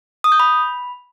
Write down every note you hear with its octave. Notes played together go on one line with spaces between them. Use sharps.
D#6
G6
B5